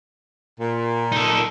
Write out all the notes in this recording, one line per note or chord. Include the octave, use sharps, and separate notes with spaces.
A#2
D#4 A4